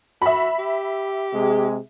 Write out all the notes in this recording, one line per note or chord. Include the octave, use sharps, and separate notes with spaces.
F#4 E5 B5
G4
C3 G#3 G#4